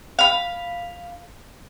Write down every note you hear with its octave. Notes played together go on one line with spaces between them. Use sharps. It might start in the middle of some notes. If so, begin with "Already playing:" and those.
F5 B5